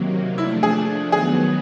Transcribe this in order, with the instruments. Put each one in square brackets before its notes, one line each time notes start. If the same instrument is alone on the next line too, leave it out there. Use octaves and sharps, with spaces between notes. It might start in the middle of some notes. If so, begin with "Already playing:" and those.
Already playing: [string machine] C3 D#3 F#3 A#3
[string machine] F3 A3 D4 [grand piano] E4
[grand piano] G#4
[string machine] D#3 F#3 B3 [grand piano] G#4